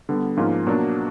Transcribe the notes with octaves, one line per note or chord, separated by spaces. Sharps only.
D3 G3 B3
G#2 F3 A#3 C#4 F4
B2 F#3 A#3 D4